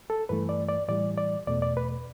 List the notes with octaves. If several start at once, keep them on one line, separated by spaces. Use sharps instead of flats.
A4
G2 E3 A3 B4
D5
D5
A2 E3 G3 D5
D5
E2 B2 A3 D5
D5
B4